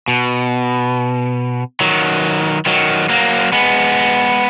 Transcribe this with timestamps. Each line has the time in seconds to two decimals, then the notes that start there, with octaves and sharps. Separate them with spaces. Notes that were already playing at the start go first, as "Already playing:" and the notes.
0.08 B2
1.80 D#3 F#3
2.66 D#3 F#3
3.09 F#3 A#3
3.52 G#3 B3